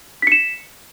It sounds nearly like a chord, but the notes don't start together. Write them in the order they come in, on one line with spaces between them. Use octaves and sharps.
B6 C#7 E7